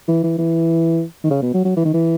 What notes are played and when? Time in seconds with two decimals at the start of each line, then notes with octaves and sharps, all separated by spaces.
0.08 E3
0.24 E3
0.38 E3
1.24 D#3
1.31 C#3
1.42 B2
1.54 F#3
1.65 F#3
1.77 E3
1.85 D#3
1.93 E3